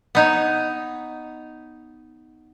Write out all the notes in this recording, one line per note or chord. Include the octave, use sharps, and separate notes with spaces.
B3 D#4 C#5